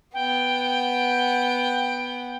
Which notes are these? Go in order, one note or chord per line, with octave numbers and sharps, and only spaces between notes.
B3 F#5 G5